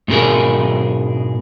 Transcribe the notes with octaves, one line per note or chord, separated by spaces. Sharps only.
G#2 B2 G#4 A#4